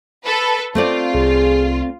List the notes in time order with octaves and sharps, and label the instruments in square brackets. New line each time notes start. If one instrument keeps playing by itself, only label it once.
[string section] A4 B4
[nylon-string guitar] A3 C4 D5 [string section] F4
[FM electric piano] C2 [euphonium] G#4